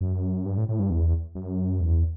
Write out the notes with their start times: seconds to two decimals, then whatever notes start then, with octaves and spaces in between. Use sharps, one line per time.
0.01 F#2
0.46 G2
0.57 A2
0.69 A2
0.79 G2
0.90 E2
1.35 F#2
1.81 E2